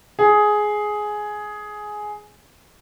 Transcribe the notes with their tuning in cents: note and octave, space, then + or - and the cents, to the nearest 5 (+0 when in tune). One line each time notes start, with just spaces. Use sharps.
G#4 +10